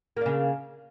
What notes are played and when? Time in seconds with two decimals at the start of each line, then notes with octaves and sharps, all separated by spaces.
0.17 A#3
0.21 D4
0.26 C#3